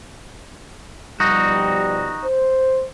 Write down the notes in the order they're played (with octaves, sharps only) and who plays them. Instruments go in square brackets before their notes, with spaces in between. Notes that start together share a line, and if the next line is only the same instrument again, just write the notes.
[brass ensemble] B2 F3 G3 [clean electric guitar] D#4 F#4
[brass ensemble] C5